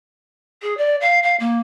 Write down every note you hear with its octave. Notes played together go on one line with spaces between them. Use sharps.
G#4
D5
F5
F5
A#3